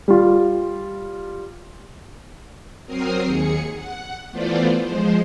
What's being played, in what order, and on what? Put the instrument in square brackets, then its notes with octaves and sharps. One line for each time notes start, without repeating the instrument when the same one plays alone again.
[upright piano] G3 F4
[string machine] F#3 C4 A#4 D#6 F6 C7
D#2 G#4 C#7
F#5
E3 A3 B3 F4 C5 D5
F3 G#3 C5